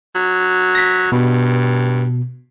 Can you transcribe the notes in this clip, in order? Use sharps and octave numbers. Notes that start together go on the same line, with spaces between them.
F#3
A#6 B6
G2 B2